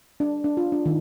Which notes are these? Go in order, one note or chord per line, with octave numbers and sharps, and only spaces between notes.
D4
D4
F4
D4
D#3